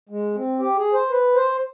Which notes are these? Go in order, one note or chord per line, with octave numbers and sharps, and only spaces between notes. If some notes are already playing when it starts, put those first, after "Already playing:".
G#3
C4
G4
G#4
C5
B4
C5